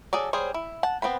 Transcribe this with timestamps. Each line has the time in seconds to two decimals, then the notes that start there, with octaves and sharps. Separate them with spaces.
0.13 F#3 G#4 A4 D5
0.33 G3 G#4 C5 C#5
0.54 E4
0.83 F#5 A5
1.02 B3 C4 C5 B5